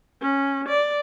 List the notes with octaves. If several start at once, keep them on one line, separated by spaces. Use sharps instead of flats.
C#4
D5